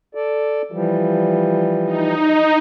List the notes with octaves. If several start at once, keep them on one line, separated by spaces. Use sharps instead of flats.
A4 D5
E3 F3 G3
D#4